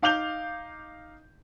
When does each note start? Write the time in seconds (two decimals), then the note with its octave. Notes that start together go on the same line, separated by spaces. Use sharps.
0.02 D#4 F5 D6 G6 F7 G7